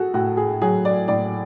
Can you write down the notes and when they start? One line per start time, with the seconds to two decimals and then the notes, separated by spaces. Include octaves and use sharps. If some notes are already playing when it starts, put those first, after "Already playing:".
Already playing: F#4 G#4 A4
0.14 A2 F#4
0.37 G#4
0.61 F#3 G#4
0.85 D5
1.08 A2 D5